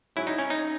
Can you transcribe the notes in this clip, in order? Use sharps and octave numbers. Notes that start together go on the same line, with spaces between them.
G#2 F#3 C#4 E4
D#4
C#4
D#4